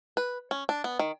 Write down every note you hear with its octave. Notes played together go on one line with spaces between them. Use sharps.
B4
C#4
D4
B3
D#3